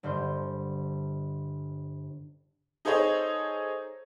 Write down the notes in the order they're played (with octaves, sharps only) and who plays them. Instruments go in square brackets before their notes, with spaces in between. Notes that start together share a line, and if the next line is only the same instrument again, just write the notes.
[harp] G1 G2 D3 C5
[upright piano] D#4 G#4 A4 C5 C#5 D#5